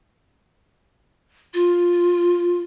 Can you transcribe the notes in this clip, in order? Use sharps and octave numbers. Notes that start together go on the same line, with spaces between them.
F4